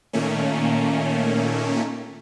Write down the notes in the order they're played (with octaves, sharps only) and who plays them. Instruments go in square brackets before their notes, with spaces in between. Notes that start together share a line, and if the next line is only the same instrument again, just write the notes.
[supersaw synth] A#2 D#3 A3 A#3 C#4